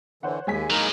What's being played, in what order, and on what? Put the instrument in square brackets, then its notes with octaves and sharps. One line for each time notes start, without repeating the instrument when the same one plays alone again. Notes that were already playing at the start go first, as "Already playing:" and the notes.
[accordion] D3 E3 [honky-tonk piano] C5 C#5 F#5
[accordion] D#2 [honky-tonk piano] G#3 G#5 B6
[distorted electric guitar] A2 F#3 [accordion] A#3 D#4 A#4